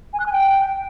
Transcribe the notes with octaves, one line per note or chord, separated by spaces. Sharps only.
G#5
F#6
G#5
G5